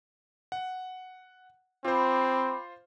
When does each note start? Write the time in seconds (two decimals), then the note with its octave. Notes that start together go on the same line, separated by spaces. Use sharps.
0.52 F#5
1.85 C4 F4 C5 B5 D6